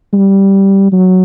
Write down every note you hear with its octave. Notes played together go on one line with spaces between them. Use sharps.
G3
F#3